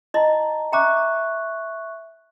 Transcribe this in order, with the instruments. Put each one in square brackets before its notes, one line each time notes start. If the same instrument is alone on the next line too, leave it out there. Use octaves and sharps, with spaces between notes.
[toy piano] E4 D#5 [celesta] A5 A#5
[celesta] E5 C#6 F#6 [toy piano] G5 A#5 D6